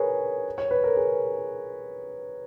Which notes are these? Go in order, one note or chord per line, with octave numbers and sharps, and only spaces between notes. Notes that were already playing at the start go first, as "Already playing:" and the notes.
Already playing: G#4 A#4 B4 C#5
C#5
B4
A#4
G#4